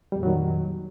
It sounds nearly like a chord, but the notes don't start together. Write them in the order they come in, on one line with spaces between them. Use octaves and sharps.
G3 F2 A#2 F#3 D#3